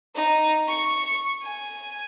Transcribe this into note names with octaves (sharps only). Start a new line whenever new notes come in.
D#4
C#6
G#5